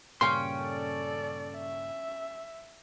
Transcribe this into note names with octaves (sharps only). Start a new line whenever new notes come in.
G2 A#2 C#3 C#4 G5 C6
A4 D5
E5